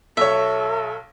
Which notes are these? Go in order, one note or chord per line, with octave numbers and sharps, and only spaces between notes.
B1 A4 C#5 E5